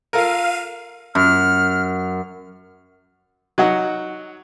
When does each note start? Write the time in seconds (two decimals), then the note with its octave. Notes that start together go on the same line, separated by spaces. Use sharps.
0.13 F4 A4 A#4 F5 D#7
1.15 F#2 F6
3.58 F#3 D#4 F#5